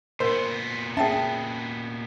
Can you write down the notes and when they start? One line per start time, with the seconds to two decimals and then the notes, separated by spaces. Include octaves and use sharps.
0.20 A#2 B3 A#4 C5
0.97 C#4 G#4 E5 G5 A5